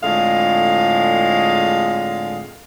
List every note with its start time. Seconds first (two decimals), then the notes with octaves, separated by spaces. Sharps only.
0.03 F2 A2 D3 G#3 G#4 F5